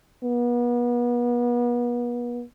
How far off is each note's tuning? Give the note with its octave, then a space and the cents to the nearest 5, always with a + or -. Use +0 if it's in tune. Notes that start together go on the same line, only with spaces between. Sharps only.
B3 -35